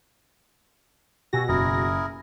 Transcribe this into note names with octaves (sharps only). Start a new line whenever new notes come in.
B2 F#4 G4 G#5 E6 A#6
F#1 E4 G#4 A#4